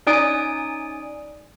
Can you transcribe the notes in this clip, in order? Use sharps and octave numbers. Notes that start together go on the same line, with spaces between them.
C#4 D#4 D5 G#5 D#6 D7